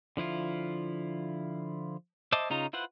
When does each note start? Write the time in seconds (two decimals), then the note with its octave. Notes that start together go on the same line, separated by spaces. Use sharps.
0.17 D3 F3 E4 F4
2.32 C5 D#5 E5 A5 D6
2.50 C#3 D#4 F4 A#5
2.73 E4 F4 B4 C5 F#5